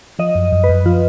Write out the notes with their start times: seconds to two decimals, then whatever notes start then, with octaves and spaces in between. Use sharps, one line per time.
0.19 F3 D#5
0.35 F#2
0.52 F#2
0.64 B4
0.69 F#2
0.85 F3 F4